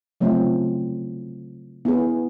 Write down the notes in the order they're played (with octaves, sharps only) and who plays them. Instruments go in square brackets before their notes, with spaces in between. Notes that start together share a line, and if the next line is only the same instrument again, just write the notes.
[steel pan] C#3 F#3 A3 C4 F4
B3 E4 G#4